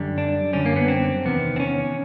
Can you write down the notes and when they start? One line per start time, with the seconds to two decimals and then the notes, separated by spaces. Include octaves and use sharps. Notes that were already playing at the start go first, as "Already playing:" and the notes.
Already playing: F#2 D3 G3
0.18 D4
0.53 F#2 D3 G3 C#4
0.66 A#3
0.76 B3
0.88 C4
1.25 E2 C3 D#3 B3
1.56 C4
1.60 C#4